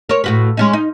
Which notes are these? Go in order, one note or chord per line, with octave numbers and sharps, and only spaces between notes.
A#4 C#5
A2 F#4 B4
G#3 C#4 D#4
D#4